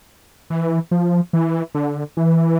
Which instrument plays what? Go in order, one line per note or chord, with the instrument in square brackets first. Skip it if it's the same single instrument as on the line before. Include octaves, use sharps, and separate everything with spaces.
[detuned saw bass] E3
F3
E3
D3
E3